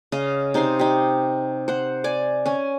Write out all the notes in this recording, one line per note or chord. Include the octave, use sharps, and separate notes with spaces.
C#3 D#5 F5
C3 D#4 C5 C6
D#4 G4
C5 F#5
D5 G#5 D6
C#4 G#5